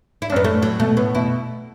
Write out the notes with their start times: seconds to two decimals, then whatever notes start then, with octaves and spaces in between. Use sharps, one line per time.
0.22 E4
0.30 D4
0.32 F#2 B3
0.44 A2 A3
0.62 A2 F#3
0.80 B2 A3
0.97 A2 B3
1.15 B2 E4